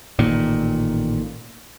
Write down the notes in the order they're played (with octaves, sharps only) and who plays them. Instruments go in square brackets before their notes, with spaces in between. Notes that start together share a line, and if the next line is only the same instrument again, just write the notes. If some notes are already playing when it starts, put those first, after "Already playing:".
[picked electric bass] A1 A#2 D#3